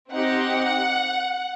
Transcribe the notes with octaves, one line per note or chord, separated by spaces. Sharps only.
C4 D#4 G4 F#5